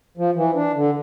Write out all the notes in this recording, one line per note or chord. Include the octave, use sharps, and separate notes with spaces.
F3
E3
D4
D3